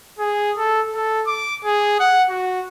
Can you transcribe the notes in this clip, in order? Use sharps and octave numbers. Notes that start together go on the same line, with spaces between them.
G#4
A4
A4
D6
G#4
F#5
F#4